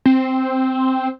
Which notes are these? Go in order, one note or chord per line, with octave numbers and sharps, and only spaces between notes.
C4